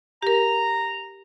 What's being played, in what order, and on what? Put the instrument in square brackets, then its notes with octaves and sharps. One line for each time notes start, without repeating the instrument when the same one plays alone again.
[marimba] G4 A#4 [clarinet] A#5